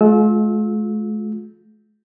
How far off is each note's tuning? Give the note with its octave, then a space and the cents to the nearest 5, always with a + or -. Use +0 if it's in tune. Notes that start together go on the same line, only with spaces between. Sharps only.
G#3 +45 F4 +25 E6 -25